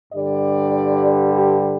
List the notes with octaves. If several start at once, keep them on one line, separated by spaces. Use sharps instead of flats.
G2 D3 G3 D5
G4